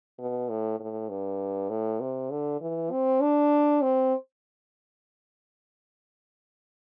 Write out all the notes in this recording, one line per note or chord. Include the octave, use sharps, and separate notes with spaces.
B2
A2
A2
G2
A2
C3
D3
E3
C4
D4
C4